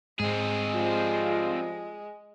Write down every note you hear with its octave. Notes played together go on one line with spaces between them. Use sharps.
G#2 G#3 C4 G#4
F3 G3 F4